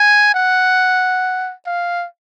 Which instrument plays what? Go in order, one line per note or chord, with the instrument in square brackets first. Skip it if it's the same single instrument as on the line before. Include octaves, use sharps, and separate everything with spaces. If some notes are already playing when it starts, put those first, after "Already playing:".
Already playing: [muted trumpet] G#5
F#5
F5